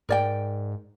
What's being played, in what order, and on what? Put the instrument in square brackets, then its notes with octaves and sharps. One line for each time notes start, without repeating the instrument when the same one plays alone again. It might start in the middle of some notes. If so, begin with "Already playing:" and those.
[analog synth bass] G#2 [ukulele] A#4 D5 G5